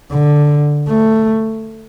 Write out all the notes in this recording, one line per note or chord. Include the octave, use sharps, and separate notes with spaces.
D3
A3